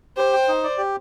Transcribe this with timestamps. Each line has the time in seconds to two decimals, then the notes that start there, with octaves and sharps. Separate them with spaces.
0.17 G4 C5
0.33 G5
0.48 D#4
0.64 D5
0.78 G4